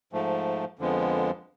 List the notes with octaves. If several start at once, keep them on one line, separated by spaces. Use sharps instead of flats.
G#2 F3 A3
F2 D3 F3 G#3 B3